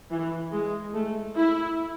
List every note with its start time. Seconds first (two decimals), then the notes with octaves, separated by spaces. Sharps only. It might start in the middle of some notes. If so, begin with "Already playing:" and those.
0.11 E3
0.52 G#3
0.94 A3
1.36 E4